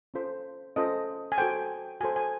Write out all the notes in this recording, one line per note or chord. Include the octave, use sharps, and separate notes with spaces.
C#4 F4 A4 C5
C#4 F4 A4 C5 D#5
G#5
F#4 A4 C5 G5
F#4 A4 C5 G#5
G#5